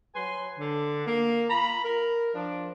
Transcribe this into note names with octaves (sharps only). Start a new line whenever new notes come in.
F#3 B4 G#5 C6
D3
A#3
F4 A#5 B5
A#4
F3 D4